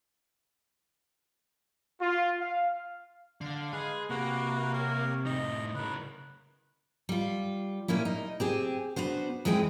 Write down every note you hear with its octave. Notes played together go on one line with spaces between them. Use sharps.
F4
F5
D3 F5
G#3 G#4 B4
C3 A#3 F#4 B4
A#4 C#5
A2 D#4 D#5
C#3 A#4 B4
G3 F4
A#2 A#3 C#4 E4
D#4
C4 G4 G#4
B3 D4 F#4 C5
E2 E3 G#3 C4 G#4 G5